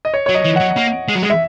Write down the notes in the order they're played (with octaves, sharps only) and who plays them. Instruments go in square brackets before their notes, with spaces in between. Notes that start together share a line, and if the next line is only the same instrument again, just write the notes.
[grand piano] D#5
C#5
[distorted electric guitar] F#3 [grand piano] C#5
[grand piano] D#5
[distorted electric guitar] E3
[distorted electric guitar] F#3 [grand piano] F#5
[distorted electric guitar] A#3
G#3
F#3
G#3
[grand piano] E5